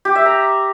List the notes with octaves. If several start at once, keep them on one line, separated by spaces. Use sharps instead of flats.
G4
E5
A#5